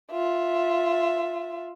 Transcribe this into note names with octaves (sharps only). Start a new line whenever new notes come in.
F4 E5